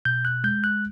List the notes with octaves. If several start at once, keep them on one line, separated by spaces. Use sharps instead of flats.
B2 G6
F#6
G#3 G6
F#6